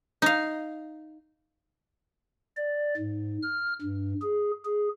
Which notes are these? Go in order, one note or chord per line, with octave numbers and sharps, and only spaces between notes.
D#4 F5
D5
G#2
F6
G2
G#4
G#4